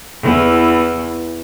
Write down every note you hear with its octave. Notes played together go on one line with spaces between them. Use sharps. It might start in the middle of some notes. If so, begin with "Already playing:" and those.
E2 E3